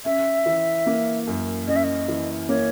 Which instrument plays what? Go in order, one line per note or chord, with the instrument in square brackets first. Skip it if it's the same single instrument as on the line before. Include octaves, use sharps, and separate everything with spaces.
[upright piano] C#4 [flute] E5
[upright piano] E3
A#3
F#2
[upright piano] C#4 [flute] D#5
[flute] E5
D#5
[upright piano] E3
[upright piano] A#3 [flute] C#5